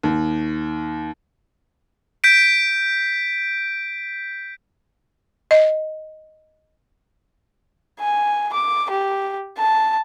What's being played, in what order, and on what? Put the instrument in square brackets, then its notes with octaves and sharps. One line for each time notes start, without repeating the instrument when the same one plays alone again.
[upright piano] D#2
[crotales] G6 B6 D7
[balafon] D#5
[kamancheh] G#5
D6
G4
A5